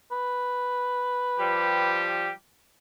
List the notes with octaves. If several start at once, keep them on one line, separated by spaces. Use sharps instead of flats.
B4
F3 G3 G4